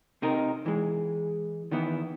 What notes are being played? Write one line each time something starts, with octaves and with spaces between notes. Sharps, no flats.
C3 D#4 A#4
E3 G#3
D#3 E3 B3 E4